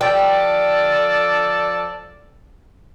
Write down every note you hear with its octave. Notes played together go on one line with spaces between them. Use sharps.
F3 A4 D5 G5